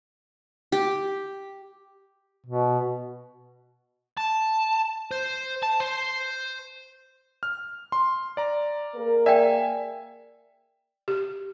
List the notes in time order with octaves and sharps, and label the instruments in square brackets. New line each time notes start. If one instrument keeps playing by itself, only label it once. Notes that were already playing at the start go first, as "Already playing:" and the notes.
[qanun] G4
[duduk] B2
[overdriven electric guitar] A5
C5
A5
C5
[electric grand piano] F6
C6
D5 A#5
[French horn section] A#3 G#4 A#4
[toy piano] D5 G5 [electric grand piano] E5 G#5
[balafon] G4